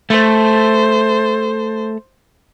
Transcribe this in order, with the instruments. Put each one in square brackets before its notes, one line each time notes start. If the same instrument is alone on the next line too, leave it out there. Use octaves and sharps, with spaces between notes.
[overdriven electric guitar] A3 [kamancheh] C5